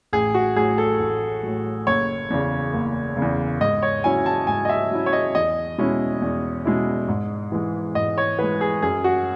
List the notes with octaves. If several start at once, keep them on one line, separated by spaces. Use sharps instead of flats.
A1 G#4
F#4
A2 F#3 G#4
A4
A1
A2 F#3
F#1 C#5
E2 C#3
F#1
E2 C#3
G#2 D#5
C#5
F#3 C#4 E4 G#5
A5
G#2 G#5
D#5
E5
F#3 C#4 E4
C#5
D#5
E2 D#5
B2 G#3 C#4 E4
E2
B2 G#3 C#4 E4
G#2
E3 G#3
G#2 D#5
C#5
E3 G#3 B4
G#4
F#2 G#4
F#4